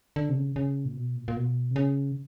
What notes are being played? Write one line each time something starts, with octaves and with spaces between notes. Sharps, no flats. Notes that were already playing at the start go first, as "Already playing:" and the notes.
D3
C3
C#3
C#3
A#2
B2
A#2
A#2
B2
C3
C#3